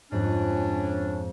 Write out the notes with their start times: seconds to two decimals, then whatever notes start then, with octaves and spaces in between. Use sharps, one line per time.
0.12 F2 G#2 C#4 D4